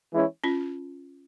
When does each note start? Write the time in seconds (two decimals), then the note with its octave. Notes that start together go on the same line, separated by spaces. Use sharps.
0.12 E3 G#3 C#4 E4
0.44 C#4 F4